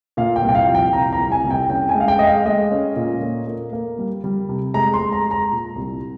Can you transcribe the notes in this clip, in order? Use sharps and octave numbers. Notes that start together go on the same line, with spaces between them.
A#2 F5
G5
C2
G5
F5
F3
G5
C2 A#5
A#5
C2
G#5
C2
G5
C#4 G5
G#5
G#3
F5
G5
G#3 D#5
F5
G#3 D#5
C#4
A#2
A#3
A#3
A#3
G3
G3
C3
G#3 A#5
C6
G#3
A#5
G#3
A#5
A#2
C2